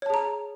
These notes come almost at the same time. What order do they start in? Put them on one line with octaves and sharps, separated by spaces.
C#5 A5 G#4 A#5